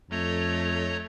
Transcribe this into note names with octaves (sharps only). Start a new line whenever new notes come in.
F2 A3 C#5 D#5 A#5